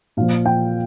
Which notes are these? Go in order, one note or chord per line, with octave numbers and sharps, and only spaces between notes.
A#2 F3 F5
G5